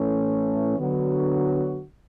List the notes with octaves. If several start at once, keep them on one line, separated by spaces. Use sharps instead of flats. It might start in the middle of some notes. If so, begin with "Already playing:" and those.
Already playing: A2 E3 A3 C#4
D3 F#3 B3 F#4